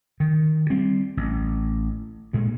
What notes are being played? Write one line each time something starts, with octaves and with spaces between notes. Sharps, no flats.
D#3
G3 C4
A1
G2 A#2 G#3